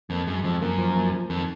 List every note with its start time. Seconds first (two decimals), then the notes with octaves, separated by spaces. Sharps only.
0.10 F2 A#3
0.27 F#2 G#3
0.44 F2 F3
0.61 F#2 A#3
0.78 F3
0.96 A#3
1.13 F3
1.30 F2 D#3